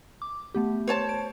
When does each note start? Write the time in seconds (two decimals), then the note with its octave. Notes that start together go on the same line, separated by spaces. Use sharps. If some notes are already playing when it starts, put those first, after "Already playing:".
0.22 D6
0.55 A3 B3 G4
0.87 C5 C#5 A5
1.09 D7